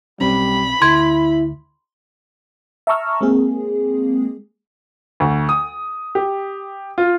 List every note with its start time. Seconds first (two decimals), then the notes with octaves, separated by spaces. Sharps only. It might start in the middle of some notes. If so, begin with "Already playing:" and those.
0.20 B1 G3 C4 C#4 B5
0.82 D2 E4 C6 G#6
2.87 E5 A5 A#5 C#6 E6 F6
3.21 G#3 A#3 C4 G#4
5.20 D2
5.49 D#6
6.15 G4
6.98 F4